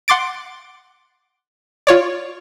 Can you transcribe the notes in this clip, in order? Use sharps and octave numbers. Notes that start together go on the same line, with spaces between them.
F#5 C6 D6 A6 D7
F4 C#5 D5